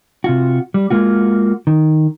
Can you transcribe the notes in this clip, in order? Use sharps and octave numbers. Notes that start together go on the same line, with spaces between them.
C3 F4 F#4
G3
G#3 A#3 F4 F#4
D#3